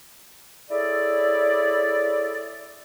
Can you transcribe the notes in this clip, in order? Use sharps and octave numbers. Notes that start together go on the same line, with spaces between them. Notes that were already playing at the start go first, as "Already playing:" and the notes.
E4 G#4 A4 C#5 D5